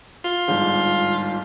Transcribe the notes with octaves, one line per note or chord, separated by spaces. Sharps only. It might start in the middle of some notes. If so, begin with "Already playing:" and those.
F4
G1 G#2